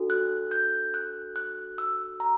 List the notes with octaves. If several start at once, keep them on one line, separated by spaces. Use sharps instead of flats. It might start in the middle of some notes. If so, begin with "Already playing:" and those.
Already playing: D4 F#4 A4
F#6
G6
F#6
F#6
E6
A#5